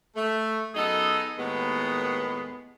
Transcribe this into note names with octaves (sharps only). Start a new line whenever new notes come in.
A3
F#2 B3 D#4 G#4 A4 D#5
D#2 A2 G#3 B3